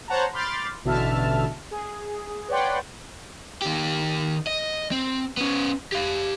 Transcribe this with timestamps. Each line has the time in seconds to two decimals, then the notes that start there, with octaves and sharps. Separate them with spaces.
0.08 C5 C#5 F#5 A5 A#5
0.33 B5 C6 D6 F6 G6 A6
0.84 A1 B2 D3 E5 A5 F6
1.71 G#4
2.48 B4 C#5 D5 F#5 G5 C6
3.62 D#3 G4
4.47 D#5
4.91 C4
5.37 B3 C#4
5.92 G4 F5